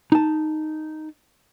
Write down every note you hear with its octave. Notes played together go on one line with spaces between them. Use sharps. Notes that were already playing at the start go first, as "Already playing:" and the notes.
D#4 A5